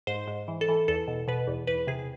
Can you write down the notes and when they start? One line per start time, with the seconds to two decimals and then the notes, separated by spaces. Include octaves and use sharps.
0.07 G#2 C5
0.28 G#2
0.48 E3
0.61 A4
0.68 E3
0.88 E2 A4
1.08 B2
1.28 B2 B4
1.47 E2
1.67 E2 B4
1.87 C3 G#4